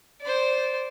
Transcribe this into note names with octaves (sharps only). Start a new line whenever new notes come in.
C5 D5